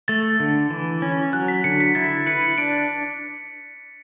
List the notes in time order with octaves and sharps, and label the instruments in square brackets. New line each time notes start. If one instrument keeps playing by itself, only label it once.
[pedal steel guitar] A3 [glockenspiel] A6
[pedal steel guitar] D3
E3
C#4
[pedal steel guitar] F#3 [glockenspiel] F#6
[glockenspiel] B6
[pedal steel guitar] D3 [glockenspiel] C#7
[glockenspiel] B6
[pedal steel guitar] E4 [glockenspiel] A6
[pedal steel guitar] B4 [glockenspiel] C#7
[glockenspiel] C#7
[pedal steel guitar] D4 [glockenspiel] D7